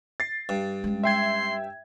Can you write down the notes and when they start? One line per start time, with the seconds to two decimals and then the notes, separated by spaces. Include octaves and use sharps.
0.20 A6 C7
0.49 G2
0.84 G#3 C#4
1.04 E5 G5 C6 G#6